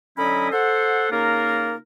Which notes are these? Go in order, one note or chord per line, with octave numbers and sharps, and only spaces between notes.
D3 F#3 C#4 E4 D#5 B5
A4 C5 F#5
C#3 A#3 D#4 F4 A#4